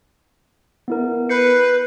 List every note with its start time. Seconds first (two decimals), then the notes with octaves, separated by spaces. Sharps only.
0.88 B3 E4 A#4
1.29 B4 G6 C7 C#7